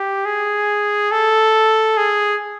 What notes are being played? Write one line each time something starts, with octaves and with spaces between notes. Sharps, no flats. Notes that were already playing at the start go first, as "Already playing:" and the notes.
Already playing: G4
G#4
A4
G#4